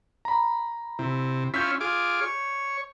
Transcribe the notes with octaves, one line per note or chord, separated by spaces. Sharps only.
A#5 B5
C3 E4
C#4 E4 F4 G6 B6
F4 G#4 D6
C#5